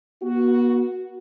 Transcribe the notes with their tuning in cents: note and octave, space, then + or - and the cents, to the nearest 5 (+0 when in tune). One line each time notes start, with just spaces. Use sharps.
B3 -45 F#4 +0